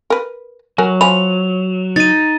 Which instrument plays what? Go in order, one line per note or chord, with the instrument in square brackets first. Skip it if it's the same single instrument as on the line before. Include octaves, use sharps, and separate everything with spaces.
[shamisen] A#4 B4
[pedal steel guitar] F#3 [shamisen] F#4 A#4 G#5
[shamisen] F3 G#5 B5 [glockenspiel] F7
[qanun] D#4 [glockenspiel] A6 D#7